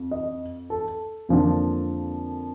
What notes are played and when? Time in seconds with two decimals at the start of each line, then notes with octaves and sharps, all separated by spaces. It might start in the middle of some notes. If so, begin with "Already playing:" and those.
Already playing: F2
0.11 D#5
0.70 A4
1.29 F2 D3 F3 A#3 D4